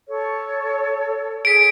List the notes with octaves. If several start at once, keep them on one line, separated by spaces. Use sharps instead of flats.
A4 C#5
G#4 B6 D7